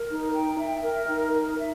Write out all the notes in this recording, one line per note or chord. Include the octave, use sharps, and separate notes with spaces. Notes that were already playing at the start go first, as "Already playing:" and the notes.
Already playing: A#4
D#4
G5
E5
A#4
D#4
A#4
E5